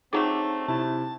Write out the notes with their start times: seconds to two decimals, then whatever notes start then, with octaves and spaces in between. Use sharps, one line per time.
0.13 D3 F#3 A3 C4 D#4 G#4 D6
0.68 C3 E4 A5